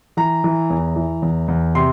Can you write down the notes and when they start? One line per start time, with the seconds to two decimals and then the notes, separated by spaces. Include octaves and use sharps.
0.17 E3 A#5
0.44 E3
0.70 E2
0.96 E3
1.22 E2
1.48 E2
1.75 C3 C6